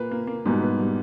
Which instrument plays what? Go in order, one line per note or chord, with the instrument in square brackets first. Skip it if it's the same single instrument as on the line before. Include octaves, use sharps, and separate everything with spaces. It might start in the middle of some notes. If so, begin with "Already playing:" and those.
Already playing: [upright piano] A#2 [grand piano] A#3 B4
[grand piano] A#3
A#3
[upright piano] G#2 B2 [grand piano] G3
[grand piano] B4
G3